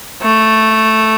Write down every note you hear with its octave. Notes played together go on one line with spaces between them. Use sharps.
A3